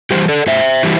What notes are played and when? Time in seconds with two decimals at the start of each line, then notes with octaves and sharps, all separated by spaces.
0.11 E3 G3 G4 C5
0.29 A4 D5
0.47 A2 C5 E5
0.83 E3 G3